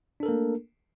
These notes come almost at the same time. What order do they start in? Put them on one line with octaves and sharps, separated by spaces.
D4 A4 A#4 A#3 A3